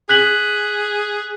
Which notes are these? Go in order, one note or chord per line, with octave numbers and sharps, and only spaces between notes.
G#4 F#6 B6 F#7